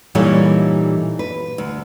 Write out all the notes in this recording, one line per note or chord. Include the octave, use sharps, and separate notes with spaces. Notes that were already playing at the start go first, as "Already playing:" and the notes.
A#2 E3 G3 D#4 A4 C#5
B4
D2